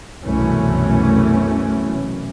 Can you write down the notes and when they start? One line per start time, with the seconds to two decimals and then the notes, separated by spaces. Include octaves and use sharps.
0.21 C2 F#2 B2 E3 A3 C#4